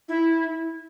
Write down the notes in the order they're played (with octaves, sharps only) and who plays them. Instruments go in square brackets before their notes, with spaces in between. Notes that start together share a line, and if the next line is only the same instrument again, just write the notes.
[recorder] E4